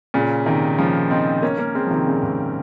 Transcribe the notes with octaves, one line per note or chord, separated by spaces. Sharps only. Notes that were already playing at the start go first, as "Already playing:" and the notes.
A#2 C#3
C3 D#3
C#3 F3
C4 D#4
A#3 C#4
A#3 C#4
G#3 C4
F3
C3 D#3
A#2 C#3
G#2